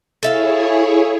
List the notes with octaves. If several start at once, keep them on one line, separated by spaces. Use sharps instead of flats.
E4 G#4 A4 C#5 E5 F5